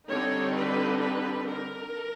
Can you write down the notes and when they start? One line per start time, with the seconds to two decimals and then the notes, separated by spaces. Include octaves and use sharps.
0.11 D3 G3 C4 D#4 C#5
0.56 B4
1.02 B4
1.48 A#4